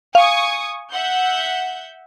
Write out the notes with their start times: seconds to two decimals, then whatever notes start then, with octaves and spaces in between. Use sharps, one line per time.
0.15 F5 G#5 C#6 D#6
0.91 E5 F#5 G6